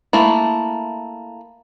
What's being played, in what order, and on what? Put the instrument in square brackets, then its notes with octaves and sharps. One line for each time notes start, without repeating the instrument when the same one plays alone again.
[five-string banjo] A3 A#3 E4